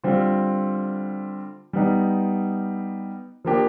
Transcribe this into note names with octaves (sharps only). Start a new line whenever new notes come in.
D3 G3 C4 F4
G3 B3 D#4
F3 A#3 D4 G4